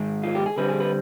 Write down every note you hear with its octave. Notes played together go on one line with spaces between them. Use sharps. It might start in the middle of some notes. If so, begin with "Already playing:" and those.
Already playing: G#2 D#3 G#3
F4
G4
G#4
D3 G3 C4 B4
G#4
B4